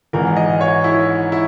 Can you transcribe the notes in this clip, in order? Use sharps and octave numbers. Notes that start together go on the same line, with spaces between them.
G#1 G#2 E3 A#4
D#5
C#5
E4
E4